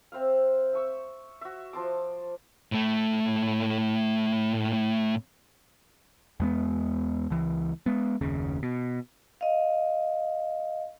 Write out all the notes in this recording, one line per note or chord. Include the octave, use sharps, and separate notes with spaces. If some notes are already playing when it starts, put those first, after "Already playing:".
C4 C5 E5 F5
E5 C#6 E6
F#4 E5
F3 A5 C6 D6
A2 A3
E2 G#3 B3
C#2 E3
G#3 B3
F#1 D#2 C#3
B2
D#5 F5